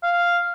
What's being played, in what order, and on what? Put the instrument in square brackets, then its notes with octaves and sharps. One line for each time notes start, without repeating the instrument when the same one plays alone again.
[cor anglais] F5